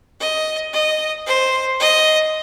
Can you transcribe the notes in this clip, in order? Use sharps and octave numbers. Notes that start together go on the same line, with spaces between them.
D#5
D#5
C5
D#5